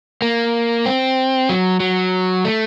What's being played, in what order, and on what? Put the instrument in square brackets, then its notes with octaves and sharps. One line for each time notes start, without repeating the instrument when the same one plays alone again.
[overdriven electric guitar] A#3
C4
F#3
F#3
A3